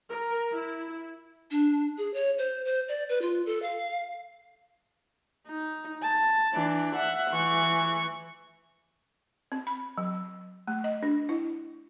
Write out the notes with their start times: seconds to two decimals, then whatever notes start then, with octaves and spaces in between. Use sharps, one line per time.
0.12 A#4
0.54 E4
1.51 D4
1.98 G#4
2.14 C#5
2.38 C5
2.65 C5
2.88 D5
3.09 B4
3.22 F4
3.46 A4
3.62 F5
5.48 D#4
6.03 A5
6.54 E3 D4
6.96 E5 F#5
7.31 E3 C#6
9.52 C4
9.67 B5
9.98 F#3
10.68 A3
10.84 D#5
11.03 D4
11.29 E4